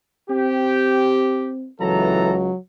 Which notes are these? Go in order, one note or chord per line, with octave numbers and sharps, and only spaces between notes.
C4 G4
C#2 E3 F#3 A4 A#5